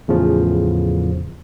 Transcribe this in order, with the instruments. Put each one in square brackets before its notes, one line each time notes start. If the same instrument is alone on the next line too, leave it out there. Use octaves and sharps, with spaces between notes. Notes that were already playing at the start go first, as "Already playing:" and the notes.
[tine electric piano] E2 A2 C#3 F3